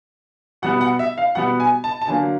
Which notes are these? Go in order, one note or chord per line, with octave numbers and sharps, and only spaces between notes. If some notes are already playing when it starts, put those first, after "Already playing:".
B2 G3 B3 F#5
F#5
E5
F5
B2 G3 B3 F#5
G#5
A5
A5
D3 F#3 A#3 G#5